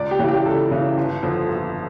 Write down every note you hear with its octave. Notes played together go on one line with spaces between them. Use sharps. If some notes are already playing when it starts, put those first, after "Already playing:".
Already playing: C#2 D5
G4
C#3 E3
G4
C#2 A4
C#3 E3
G1
F2 D3 F3
G1